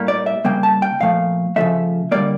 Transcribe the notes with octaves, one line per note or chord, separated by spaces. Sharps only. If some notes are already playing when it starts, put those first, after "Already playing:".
Already playing: A2 G3 A#3
D5
E5
C#3 G3 A#3 G5
A5
G5
A#2 F3 A3 F5
C#3 F3 A3 E5
D3 G3 A#3 D5